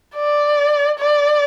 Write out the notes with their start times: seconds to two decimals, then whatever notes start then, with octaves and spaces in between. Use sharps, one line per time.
0.15 D5
0.99 D5